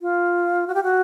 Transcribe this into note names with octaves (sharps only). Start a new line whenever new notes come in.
F4
F#4
G4
F#4